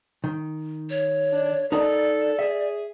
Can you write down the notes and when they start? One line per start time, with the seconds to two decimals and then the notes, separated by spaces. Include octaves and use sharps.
0.24 D#3
0.90 C#5
1.32 D4
1.72 D#4 A4 A#4 D5 A5
2.39 G#4 E5